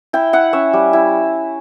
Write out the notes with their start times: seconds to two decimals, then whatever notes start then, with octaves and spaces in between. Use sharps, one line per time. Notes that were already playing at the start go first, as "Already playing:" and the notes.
0.13 E4 G5
0.33 E4 F#5
0.53 C#4 E5
0.73 G3
0.93 E4